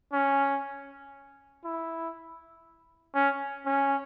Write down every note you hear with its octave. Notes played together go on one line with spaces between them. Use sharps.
C#4
E4
C#4
C#4